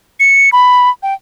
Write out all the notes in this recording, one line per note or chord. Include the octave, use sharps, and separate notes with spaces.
C#7
B5
G5